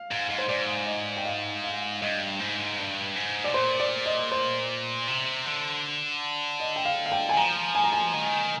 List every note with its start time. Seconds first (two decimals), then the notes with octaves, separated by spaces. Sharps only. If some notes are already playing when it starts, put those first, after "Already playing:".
Already playing: F5
0.11 G#2
0.30 G#2
0.38 C5
0.49 G#2 D5
0.87 D#5
1.17 G5
1.25 F5
1.64 F5
2.02 G2 D#5
2.40 G#2
2.78 G2
3.16 G#2
3.44 C3 D5
3.54 A#2 C5
3.80 D5
4.06 D#5
4.32 C5
5.08 C3
5.46 D3
6.60 D#5
6.76 G5
6.85 F5
7.06 F5
7.12 G5
7.29 G#5
7.37 F3 A#5
7.75 G#5
7.84 A#5
7.93 G#5
8.14 D#3